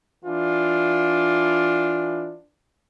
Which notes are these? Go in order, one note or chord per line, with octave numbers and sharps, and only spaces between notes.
E3 D4 F4